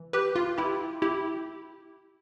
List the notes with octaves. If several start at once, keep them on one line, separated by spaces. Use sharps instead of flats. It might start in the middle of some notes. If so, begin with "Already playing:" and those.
Already playing: E3
G4 B4
F4
E4 G4
E4 G4